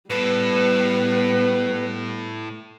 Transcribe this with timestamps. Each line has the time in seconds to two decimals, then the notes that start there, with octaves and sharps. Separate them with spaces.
0.10 A2 G3 B3 A4 B4